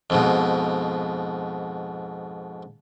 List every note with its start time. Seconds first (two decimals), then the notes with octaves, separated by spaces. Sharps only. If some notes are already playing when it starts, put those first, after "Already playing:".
0.10 F2 G#2 B2